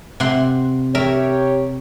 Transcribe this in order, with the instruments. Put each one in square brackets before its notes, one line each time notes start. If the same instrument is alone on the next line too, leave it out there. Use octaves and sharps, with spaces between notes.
[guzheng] C3 F#5 C6
[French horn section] G4 C#5 [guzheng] A#4 E5